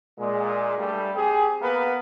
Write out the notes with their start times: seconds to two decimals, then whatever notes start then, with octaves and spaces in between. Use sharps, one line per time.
0.19 A#2 G#3
0.78 G2 G3 A3
1.16 C4 G4 G#4
1.62 A#3 B3 A#4 B4